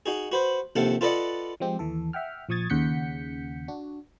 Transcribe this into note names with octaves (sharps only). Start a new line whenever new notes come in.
D#4 F#4 G#4
F#4 B4 C5
A#1 D#2 C3 A4 F5 F#5
F4 A4 B4 D5 D#5 F#5
F3 G#3 C4 G4
D#2 E3 A4
E5 F#5 G5 F6
A#1 F3 C#6 D#6 G#6 A6
D#2 C#3 F#5 G6 B6 C#7
D4 F#4